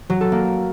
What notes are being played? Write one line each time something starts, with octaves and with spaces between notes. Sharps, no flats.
F#3
A4
A#3